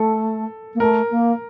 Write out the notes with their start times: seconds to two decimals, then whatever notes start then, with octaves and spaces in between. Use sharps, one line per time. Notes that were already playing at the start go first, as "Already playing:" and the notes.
Already playing: A3 A4
0.75 A#3
0.80 A3 A#4
1.10 A#3